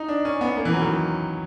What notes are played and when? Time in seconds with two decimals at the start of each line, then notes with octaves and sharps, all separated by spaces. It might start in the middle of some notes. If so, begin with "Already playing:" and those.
Already playing: D#4
0.08 D4
0.25 C#4
0.41 B3
0.57 A#3
0.65 E3
0.73 F#3
0.81 D#3